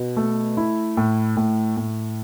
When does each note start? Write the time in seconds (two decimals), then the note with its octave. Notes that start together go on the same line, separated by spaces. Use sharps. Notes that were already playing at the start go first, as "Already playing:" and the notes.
Already playing: B2
0.17 A3
0.57 E4
0.97 A2
1.37 A2
1.77 A2